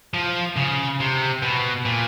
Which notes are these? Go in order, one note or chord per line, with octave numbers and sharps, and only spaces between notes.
F3
C#3
C3
B2
A#2